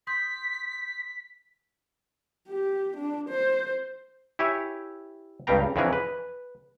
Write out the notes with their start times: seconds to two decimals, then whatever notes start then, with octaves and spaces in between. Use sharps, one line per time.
0.07 C6 D#6 G6 B6
2.48 G4
2.97 D4
3.29 C5
4.39 E4 G4 C#5 E5 G#5
5.47 C#2 G2 G3 F5 G5 A#5
5.76 F2 D3 E3 C#4 G#4 A#4
5.93 B4